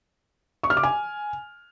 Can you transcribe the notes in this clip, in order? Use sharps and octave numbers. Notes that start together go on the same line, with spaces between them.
C#6
F6
D6
G#5